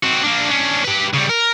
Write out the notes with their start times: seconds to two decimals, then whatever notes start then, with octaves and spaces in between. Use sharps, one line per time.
0.03 C4 F#4
0.23 A#3 D4
0.50 C#4 D4
0.85 G4 B4
1.14 C#3 G3
1.29 A#4